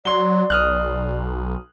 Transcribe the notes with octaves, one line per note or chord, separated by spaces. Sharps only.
F#3 D5 C6 G7
B1 D#6 F6 F#6